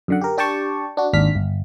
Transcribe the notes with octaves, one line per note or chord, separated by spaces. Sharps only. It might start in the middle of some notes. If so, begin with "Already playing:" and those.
F#2 D3 F#5
G4 A#4
D4 G4 D5 G5 A5 C#6
D4 F#4
G#1 D#2 D4 F6 B6
G1